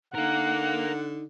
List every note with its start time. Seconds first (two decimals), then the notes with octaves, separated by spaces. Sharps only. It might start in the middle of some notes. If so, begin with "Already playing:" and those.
0.14 D3 D#4 A#4 F5 F#5